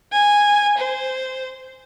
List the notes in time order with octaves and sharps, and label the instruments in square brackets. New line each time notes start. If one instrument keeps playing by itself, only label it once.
[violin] G#5
C5